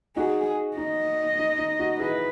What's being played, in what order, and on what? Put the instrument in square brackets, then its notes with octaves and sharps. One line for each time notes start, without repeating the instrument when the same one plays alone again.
[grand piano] D#4 F#4 [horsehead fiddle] G#4
[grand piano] D#4 [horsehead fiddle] D#5
[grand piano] D#4
D#4
D#4 F#4
[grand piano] E4 G#4 [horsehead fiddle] B4